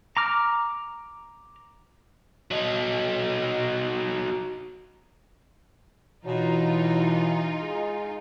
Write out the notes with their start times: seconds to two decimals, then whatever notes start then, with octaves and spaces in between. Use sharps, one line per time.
0.17 A#5 D6 F6
2.51 F#3 D#4
6.26 B2 E3 F#3 D#4 F4
7.62 G#3